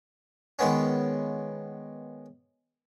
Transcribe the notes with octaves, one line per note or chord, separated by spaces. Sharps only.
D#3 G#3 B3 C#4